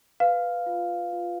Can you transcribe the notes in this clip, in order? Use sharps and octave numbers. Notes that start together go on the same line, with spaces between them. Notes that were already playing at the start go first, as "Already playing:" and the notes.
B4 F5
F4
F4